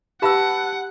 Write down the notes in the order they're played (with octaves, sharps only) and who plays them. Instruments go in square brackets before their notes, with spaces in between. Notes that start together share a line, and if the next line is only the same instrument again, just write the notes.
[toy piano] G4 F5 E6 [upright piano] B4 A5 B5 [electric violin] F#5